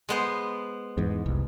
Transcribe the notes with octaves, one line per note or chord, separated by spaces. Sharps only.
G#3 B3 C5
E2 G#2
F1 C2